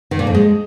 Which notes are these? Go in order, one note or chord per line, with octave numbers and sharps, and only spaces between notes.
D#3
A#2
F2
G#3